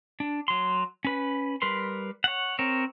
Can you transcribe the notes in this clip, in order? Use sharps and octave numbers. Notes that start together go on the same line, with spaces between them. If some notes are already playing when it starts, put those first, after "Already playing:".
D4
F#3 C6
C#4 B4
G3 A#4 B4 C6
C#5 F#5
C4 A#4 C#5